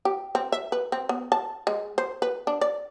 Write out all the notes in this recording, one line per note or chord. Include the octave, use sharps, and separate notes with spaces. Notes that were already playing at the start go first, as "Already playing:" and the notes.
G4
C4
E5
B4
C4
B3
A5
G#3
C5
B4
D4
D5